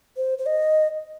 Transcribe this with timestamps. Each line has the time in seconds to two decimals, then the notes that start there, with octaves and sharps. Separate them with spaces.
0.17 C5
0.38 C5
0.46 D#5